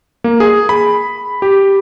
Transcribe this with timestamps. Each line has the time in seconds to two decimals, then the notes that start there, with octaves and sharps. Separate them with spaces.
0.24 A#3
0.40 G#4
0.69 B5
1.42 G4